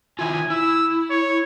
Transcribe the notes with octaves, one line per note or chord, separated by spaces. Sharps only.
D#3 E4 F4 G#5
E4 E6
C#5